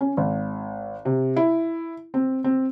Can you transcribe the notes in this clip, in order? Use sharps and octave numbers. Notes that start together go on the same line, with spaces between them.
C#4
G#1
C3
E4
C4
C4